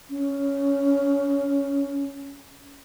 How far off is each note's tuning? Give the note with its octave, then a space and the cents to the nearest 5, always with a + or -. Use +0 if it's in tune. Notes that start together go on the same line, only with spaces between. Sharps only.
C#4 +10